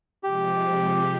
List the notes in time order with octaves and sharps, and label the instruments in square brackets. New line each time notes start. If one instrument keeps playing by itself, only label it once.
[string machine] C3 F3 G#3 [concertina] G4